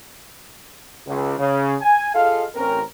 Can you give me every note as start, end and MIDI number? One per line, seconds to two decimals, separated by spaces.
1.07 1.35 37
1.38 1.75 49
1.81 2.10 80
2.15 2.45 65
2.15 2.45 68
2.15 2.45 69
2.15 2.45 75
2.15 2.45 77
2.55 2.81 33
2.55 2.81 60
2.55 2.81 61
2.55 2.81 70